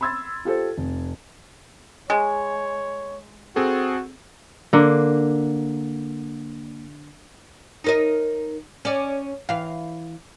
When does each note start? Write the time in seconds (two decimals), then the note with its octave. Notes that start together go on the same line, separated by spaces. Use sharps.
0.01 B5 C6 E6 G#6 A6
0.45 F4 G4 A4 C5
0.78 F1
2.10 G#3 C#5
3.56 C4 F#4 G#4 A4
4.73 D3 A#3
7.84 D#4 A#4 D#5
8.85 C#4 D5
9.49 E3 F5